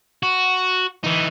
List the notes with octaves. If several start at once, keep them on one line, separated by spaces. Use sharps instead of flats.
F#4
E3 D#4